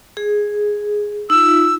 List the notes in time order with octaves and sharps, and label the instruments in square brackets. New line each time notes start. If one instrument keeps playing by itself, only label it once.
[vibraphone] G#4
[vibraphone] D#4 F4 [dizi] E6